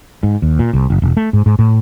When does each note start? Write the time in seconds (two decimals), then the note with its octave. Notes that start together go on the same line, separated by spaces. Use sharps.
0.23 G#2
0.42 D#2
0.59 A#2
0.73 C2
0.90 F#1
1.02 E1
1.17 A3
1.33 G#2
1.46 G#2
1.59 A2